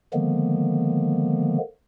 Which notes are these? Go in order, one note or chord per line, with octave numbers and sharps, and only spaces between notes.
D3 D#3 F3 G#3 A#3 B3